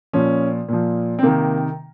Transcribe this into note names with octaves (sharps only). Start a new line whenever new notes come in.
A#2 F3 C#4
A#2 F3
C4
C3 D#3 A#3